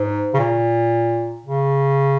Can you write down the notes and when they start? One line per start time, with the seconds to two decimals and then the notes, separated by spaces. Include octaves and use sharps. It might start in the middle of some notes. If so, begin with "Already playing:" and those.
Already playing: G#2
0.33 C#3
0.39 A#2
1.46 C#3